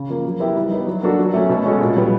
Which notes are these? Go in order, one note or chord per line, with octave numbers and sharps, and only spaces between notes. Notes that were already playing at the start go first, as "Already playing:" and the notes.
Already playing: C#3
F3 A#3
F#3
B3 E4 G4 A#4
G3
B3 D#4
F#3
A#3 D4 F#4 A4
F#3
A3 C#4
B2
G#3 C#4 F#4 A4
A#2
G3 B3